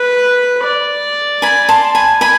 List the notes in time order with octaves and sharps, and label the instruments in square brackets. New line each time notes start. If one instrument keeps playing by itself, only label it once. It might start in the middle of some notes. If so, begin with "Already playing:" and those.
Already playing: [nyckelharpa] B4
D5
[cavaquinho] G#5 B5
A5 C6
G#5 B5
G#5 B5